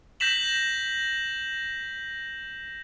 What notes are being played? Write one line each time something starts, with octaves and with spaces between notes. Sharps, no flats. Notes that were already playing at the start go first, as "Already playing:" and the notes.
G6 A#6 B6 E7 F#7